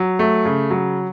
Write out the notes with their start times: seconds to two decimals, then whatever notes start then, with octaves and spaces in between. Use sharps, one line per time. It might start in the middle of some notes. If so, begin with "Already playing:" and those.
Already playing: F#3
0.19 A3
0.45 C#3
0.70 F#3